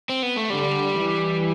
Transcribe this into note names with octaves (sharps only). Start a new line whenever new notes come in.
C4
B3
A3
D3 G3
E3